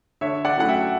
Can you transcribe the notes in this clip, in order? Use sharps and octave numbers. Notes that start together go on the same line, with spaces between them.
D3 C#5 E5
D5 F#5
F#3 A3 C#4 E4 F#5
E5 G5